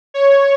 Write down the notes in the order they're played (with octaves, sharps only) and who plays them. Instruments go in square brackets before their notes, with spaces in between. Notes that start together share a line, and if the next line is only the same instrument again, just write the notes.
[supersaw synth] C#5